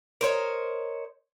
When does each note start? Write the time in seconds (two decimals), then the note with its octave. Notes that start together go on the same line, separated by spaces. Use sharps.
0.21 A#4 C5 C#5 D#5